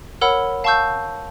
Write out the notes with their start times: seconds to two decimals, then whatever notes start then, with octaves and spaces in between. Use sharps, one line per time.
0.21 A#4 C#5 F#5 B5 E6
0.64 F5 A5 C#6 E6 G6